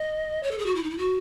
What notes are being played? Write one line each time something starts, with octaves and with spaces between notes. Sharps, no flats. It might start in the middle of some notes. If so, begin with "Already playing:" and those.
Already playing: D#5
C#5
A4
G#4
F#4
E4
D#4
E4
F#4